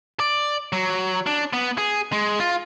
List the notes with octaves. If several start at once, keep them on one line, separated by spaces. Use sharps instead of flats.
D5
F#3
D4
B3
G#4
G#3
F4